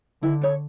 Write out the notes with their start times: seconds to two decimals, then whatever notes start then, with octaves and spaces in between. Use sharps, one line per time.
0.22 D3 E4
0.41 A4 C#5